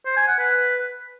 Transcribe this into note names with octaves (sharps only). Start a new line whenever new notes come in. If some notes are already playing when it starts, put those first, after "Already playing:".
C5
G#5
F#5
B4